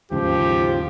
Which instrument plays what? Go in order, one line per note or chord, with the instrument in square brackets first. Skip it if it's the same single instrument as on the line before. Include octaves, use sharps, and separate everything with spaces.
[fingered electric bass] D#2 G#2 C#3 [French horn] F3 [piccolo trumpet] G4